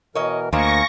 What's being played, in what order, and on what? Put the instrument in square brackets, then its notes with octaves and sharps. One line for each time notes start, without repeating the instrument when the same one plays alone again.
[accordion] B2 E3 A#4 [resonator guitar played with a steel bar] C#5 D#5
[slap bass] D2 [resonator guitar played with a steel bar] A#3 C5 D#5 [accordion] F5 G#5 [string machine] C#6 A#6